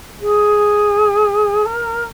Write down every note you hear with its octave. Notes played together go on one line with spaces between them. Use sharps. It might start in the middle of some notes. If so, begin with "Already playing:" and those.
G#4
A#4